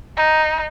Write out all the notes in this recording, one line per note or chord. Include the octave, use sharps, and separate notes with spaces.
D#4